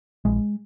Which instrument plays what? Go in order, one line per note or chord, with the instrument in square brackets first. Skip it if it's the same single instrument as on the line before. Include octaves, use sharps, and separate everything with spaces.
[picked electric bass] A#1 G#3